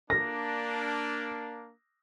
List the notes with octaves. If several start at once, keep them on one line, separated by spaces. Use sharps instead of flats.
A#3 D4 A#6